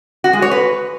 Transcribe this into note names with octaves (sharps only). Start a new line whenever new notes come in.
F#4
G#3
C#5
B4